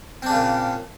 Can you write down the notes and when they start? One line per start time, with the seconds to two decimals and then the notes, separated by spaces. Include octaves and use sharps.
0.22 C4
0.26 D4
0.30 C#3
0.34 A#2